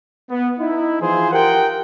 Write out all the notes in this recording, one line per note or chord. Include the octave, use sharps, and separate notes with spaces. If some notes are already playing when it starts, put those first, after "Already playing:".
B3
D#4 E4
E3 F3 F4 G#4 C5
F4 G4 A#4 F#5 G5